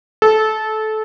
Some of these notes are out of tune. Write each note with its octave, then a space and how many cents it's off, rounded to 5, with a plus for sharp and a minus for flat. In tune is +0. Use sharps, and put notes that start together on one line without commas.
A4 -20